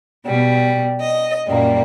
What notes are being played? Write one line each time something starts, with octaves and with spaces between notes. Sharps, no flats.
B2 G3
D#5
F#2 A#2 G3 A#3